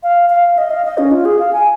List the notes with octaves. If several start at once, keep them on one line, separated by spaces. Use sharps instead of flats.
F5
F5
D#5
F5
D#5
C#4
F4
G#4
F5
G#5